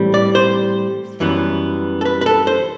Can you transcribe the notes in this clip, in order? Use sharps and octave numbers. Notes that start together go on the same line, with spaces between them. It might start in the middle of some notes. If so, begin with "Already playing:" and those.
Already playing: A2 E3 G3 C4
D5
C5
F#2 E3 G3 B3
A4
B4
B4
A4
C5